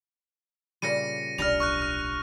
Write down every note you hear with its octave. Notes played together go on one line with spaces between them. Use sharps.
A#2 C#3 G3 A#6 C#7 D#7
D1 B1 G3 D4 F6 A#6 F7
C#6 F6 F#6
F6